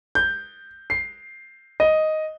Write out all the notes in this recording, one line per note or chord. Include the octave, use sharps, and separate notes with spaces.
G6
C7
D#5